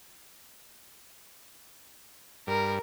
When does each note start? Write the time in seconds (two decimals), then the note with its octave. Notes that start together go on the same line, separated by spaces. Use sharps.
2.47 G2 A#4